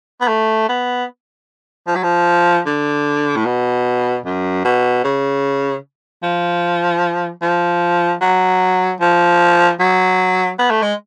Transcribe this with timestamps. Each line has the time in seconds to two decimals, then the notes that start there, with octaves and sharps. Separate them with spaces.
0.21 B3
0.28 A3
0.69 B3
1.87 F3
1.95 F#3
2.03 F3
2.66 D3
3.36 A2
3.46 B2
4.25 F#2
4.65 B2
5.04 C#3
6.23 F3
7.42 F3
8.21 F#3
9.00 F3
9.80 F#3
10.59 B3
10.70 A3
10.82 G#3